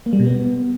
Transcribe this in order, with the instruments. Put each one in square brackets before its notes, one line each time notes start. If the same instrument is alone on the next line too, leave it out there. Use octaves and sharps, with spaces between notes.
[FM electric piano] A#3
G3
B2
B3